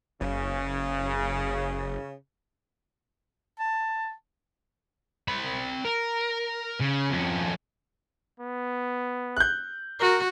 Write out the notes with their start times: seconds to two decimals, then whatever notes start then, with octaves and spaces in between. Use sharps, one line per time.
0.21 F#1 C#3
3.59 A5
5.28 C4 B5
5.85 A#4
6.80 C#3
7.11 F2 C#4
8.40 B3
9.37 F#6 G6
10.00 F#4 A#4